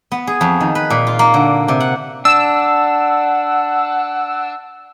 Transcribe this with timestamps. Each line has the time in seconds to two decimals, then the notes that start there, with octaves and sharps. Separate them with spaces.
0.12 B3
0.27 G#4
0.41 F2
0.60 D#3
0.75 B4
0.90 A#2
1.07 F4
1.19 A#3
1.34 D3
1.68 C3
1.80 F#5
2.25 D4 F#5 E6